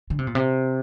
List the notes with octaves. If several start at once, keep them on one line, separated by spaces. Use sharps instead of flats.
D3
C3
A#2
C3